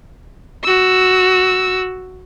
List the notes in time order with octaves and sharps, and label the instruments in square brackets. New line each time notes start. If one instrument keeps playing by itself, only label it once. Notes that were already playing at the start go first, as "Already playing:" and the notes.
[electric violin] F#4 E6